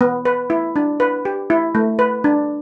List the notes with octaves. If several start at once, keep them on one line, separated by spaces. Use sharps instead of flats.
B3
B4
E4
D4
B4
G4
E4
A3
B4
D4